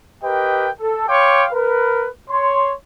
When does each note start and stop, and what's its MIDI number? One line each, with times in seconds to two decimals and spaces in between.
0.23 0.69 67
0.23 0.69 70
0.23 0.69 71
0.23 0.69 75
0.23 0.69 79
0.79 1.04 69
1.08 1.45 73
1.08 1.45 77
1.08 1.45 79
1.08 1.45 84
1.08 1.45 86
1.53 2.07 70
1.53 2.07 71
2.29 2.71 73
2.29 2.71 84